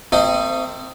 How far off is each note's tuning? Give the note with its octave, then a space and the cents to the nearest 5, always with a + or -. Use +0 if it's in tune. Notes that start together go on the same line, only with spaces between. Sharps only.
A3 +45 C4 -15 D#4 +0